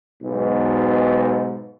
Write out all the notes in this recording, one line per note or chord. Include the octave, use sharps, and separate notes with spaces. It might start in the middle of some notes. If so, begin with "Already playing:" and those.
B1 G#2 B2